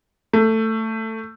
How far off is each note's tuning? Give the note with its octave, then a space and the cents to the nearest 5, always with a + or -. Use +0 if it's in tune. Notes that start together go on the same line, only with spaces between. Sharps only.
A3 +15